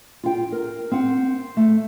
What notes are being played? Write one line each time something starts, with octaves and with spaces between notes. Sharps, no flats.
F4 G5
A#4
C4 F#5
A3